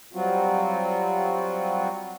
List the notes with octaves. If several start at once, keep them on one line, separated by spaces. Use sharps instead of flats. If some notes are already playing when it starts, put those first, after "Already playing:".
F#3 G3 C4 F4 F#4